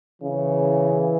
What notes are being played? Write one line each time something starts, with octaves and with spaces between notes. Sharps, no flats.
C#3 E3